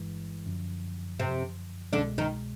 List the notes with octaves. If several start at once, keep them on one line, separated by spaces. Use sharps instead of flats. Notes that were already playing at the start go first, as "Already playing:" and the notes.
Already playing: G1 G2 E3 G#3
F#2 D3 F3
C3 C4
C2 B2 D3 G#3 D4
D#3 D#4